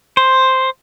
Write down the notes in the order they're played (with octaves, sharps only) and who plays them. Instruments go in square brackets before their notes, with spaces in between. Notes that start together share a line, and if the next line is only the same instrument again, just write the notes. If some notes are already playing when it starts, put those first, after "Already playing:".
[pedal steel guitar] C5